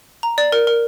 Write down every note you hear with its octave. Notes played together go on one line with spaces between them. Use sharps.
A#5
D5
A#4
A#4